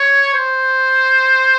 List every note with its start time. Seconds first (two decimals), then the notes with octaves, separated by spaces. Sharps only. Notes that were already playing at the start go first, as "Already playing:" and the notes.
Already playing: C#5
0.34 C5